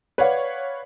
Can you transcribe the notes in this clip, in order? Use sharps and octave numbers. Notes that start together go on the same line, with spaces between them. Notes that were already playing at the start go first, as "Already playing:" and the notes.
B4 C#5 D5 F5 F#5